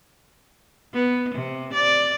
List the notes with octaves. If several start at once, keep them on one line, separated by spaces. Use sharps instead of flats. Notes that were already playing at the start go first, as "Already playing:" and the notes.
B3
C3
D5